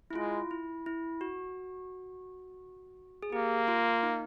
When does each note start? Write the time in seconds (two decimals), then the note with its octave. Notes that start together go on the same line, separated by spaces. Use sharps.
0.10 E4
0.15 G#3 F4
0.51 E4
0.86 E4
1.21 F#4
3.23 G#4
3.33 A#3 G4
3.68 F4
4.03 D#4